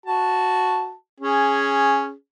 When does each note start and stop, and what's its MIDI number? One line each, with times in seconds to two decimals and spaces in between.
0.06 0.92 66
0.06 0.92 81
1.20 2.12 61
1.20 2.12 68